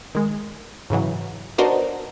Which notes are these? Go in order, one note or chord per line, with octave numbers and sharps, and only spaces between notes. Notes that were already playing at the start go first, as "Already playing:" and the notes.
D#3 G#3
G#2 C#3 E3 F#3
B3 D4 D#4 F#4 A#4 C5